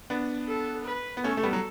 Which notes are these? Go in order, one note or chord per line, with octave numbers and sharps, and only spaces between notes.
B3 D4
A4
B4
B3
A3 C#4 A4
A3
G3 B3
F#3